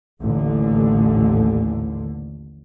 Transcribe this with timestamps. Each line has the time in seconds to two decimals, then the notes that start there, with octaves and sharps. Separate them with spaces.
0.21 A1 D#2 D3